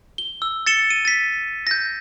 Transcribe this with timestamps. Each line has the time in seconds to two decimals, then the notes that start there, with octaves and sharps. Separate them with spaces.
0.18 G7
0.42 E6
0.66 A6 C#7 E7 G7
0.90 D#7
1.05 A6 B6
1.67 G6 A#6